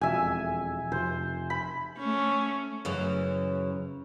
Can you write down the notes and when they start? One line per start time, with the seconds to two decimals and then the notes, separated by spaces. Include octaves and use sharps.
0.01 E1 F2 E5 G#5
0.92 F1 C5
1.50 B5
1.99 A3 C#4
2.85 F#2 C#3 E3